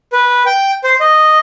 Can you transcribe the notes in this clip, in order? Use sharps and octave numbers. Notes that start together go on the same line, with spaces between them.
B4
G5
C5
D#5